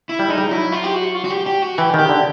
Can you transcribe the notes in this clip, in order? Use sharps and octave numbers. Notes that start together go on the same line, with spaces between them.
E4
G3
G#3 D#4
G3
F#3 E4
F4
G4
F#4
F4
F#4
G4
G4
F#4
E3 G4
D#3
G4
D3